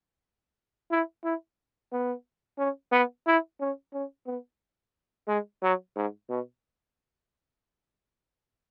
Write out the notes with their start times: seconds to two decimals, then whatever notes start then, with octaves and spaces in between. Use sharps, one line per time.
0.91 E4
1.24 E4
1.92 B3
2.58 C#4
2.92 B3
3.27 E4
3.60 C#4
3.93 C#4
4.27 B3
5.28 G#3
5.62 F#3
5.96 G#2
6.29 B2